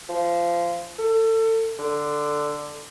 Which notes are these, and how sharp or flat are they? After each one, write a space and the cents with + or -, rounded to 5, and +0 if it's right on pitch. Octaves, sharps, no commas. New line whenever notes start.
F3 -20
A4 +30
D3 +10